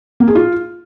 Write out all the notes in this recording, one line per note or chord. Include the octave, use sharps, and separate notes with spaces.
A#3
G#4
F4